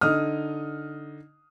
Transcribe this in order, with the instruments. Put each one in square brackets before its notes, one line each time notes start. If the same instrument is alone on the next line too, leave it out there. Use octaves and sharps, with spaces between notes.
[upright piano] D3 D#4 D#6 F6